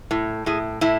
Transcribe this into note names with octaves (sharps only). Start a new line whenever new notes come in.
A2
A2 G#4
A2 E4